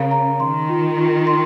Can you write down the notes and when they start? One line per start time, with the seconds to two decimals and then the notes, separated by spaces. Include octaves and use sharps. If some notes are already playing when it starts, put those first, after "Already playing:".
Already playing: C#3 A#4 F5 A#5
0.11 A#5
0.40 D#3 C6
0.69 F4
0.98 F4
1.27 C6